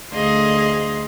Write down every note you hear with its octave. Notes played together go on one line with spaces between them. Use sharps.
D2 G#4 D#5 F5 C6